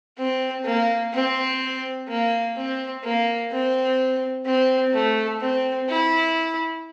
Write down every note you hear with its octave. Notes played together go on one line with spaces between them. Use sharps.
C4
A#3
C4
A#3
C4
A#3
C4
C4
A3
C4
E4